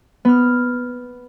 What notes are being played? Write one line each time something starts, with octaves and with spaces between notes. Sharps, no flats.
B3 F6